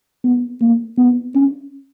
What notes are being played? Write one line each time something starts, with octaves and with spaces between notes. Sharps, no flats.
B3
A#3
B3
C#4